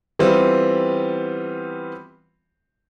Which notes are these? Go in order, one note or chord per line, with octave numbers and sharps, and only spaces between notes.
E3 G3 B3 C4 F4